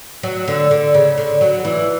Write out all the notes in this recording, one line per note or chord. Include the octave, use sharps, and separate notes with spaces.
F#3
D3
D3
C#3
D3
F#3
E3